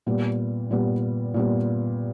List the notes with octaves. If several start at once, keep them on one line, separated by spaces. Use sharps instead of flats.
A#2 G3 B3
A#2 G3 B3
A#2 G3 B3